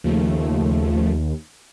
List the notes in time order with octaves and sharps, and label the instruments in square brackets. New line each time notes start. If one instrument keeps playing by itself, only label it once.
[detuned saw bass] D#2 [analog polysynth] C#3 F3 A3